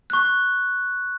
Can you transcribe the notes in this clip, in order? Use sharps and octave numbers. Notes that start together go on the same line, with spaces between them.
C#6 F#6